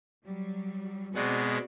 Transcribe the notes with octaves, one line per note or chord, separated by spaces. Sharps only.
F#3 G3
B2 G#3 B3 C4 F#4 D5